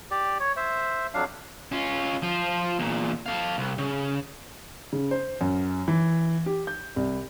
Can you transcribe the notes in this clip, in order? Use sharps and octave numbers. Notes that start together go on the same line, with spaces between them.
G4 D5
C#5
C5 E5
F2 F#3 D4 F5
C#4 F4
F3 F4
E2 A#2
A4 F5
C2
C#3
C#3
C5
F#2
E3
G4
G6
C2